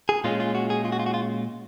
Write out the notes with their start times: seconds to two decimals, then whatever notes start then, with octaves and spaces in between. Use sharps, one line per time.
0.09 G#4
0.24 A#2 G#3 C#4 F4
0.40 F4
0.55 F#4
0.70 G#4
0.85 F4
0.92 F#4
0.99 F4
1.06 F#4
1.14 F4